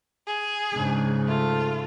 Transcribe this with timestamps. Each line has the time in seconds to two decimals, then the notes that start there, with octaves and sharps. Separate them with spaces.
0.27 G#4
0.74 G#2 C#3 D4
1.27 A3 F4